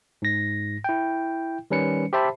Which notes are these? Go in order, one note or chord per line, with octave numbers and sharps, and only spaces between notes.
G#2 A#6
E4 G5
D#3 G3 C#4 B4 C#7
G4 C5 E5 A5 B5